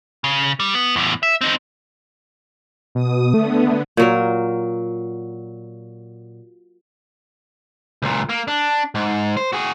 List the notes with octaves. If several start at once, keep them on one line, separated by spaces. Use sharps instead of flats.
C#3
G3
B3
E2 A2
E5
C4 D#4
B2 D#6
D3 A3 B3
A#2 F#3 A#4
C#2 A#2
A#3
D4
G#2
C5
F#4 G#4